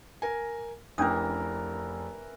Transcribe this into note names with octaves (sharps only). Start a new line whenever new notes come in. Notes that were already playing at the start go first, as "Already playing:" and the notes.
A#4 G#5
F1 E3 C#4 D4 A#4 D#6